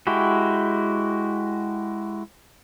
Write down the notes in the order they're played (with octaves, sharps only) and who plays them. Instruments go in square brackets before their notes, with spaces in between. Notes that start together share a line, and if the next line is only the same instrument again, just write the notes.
[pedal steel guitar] G#3 E4 F#4 G4